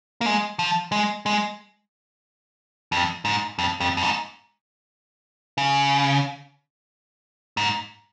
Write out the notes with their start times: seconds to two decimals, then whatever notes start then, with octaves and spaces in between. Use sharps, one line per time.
0.21 A#3
0.26 G#3
0.59 F3
0.92 G#3
1.26 G#3
2.92 F2
3.25 G#2
3.59 F2
3.80 F2
3.97 F2
4.03 G#2
5.58 C#3
7.57 G#2